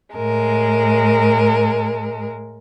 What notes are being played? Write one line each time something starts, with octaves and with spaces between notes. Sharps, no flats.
A2 G#3 A#4